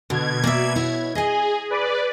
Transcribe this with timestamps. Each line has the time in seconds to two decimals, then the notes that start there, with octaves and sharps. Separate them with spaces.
0.10 B2 D3 G#6
0.44 A#3 D5 E5
0.76 E4 C#5
1.15 G#4 D#5 G#5
1.70 B4 D5